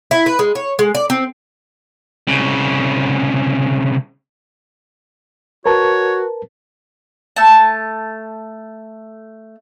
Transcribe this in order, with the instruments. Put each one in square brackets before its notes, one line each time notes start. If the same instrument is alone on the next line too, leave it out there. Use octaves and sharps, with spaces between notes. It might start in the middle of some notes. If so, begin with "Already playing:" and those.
[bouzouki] E4
B4
G#3
C#5
G#3
D5
C4
[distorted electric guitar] C2 C#3
[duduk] F#4 [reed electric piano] A#4 B4 A5 [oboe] C#5
[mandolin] A3 A5